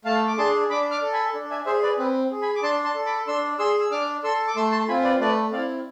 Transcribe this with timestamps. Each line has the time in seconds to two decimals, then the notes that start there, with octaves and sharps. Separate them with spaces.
0.05 A3 F5 A5
0.27 D6
0.38 D4 G#4 A5 C6
0.70 D4 B5 D6
0.91 D6 F6
1.02 A4
1.13 G#5 B5
1.34 D4
1.51 E5 G#5
1.66 G#4 C5 E5
1.83 B4 D5
1.98 C4 B4
2.31 G#4
2.42 G#5 B5
2.56 D6
2.63 D4 A5 C6
2.84 A5 C6
2.95 A4
3.06 B5 D6
3.27 D4 C6 E6
3.59 G#4 C6 E6
3.81 E6
3.91 D4 D6 F6
4.24 A4 C6 E6
4.48 D6
4.56 A3 C6 E6
4.71 A5 C6
4.88 C4 F4 G#5 B5
5.04 B4 D5
5.20 A3 B4 D5
5.52 C4 E4 D5 F5